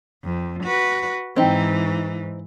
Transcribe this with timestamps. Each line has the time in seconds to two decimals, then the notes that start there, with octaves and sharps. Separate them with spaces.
0.24 F2
0.64 F#4 B4
1.36 G#2 E3 C4 D#4